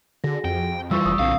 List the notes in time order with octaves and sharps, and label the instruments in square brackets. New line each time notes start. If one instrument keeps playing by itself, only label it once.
[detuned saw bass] D3 [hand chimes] F#4 G#4 A#6
[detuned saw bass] F2 [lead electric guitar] G5
[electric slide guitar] E3 F4 [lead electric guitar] G3 [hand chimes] C#6 E6
[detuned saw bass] F1 [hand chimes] D#6
[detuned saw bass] B1 [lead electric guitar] D3 C4 [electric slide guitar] F5